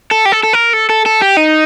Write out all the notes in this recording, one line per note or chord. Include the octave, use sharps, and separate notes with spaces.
A4
G4
A4
A4
A#4
A4
A4
A4
G4
D#4